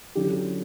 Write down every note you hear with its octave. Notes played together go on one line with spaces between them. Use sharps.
D3 F#3 C#4 E4 G4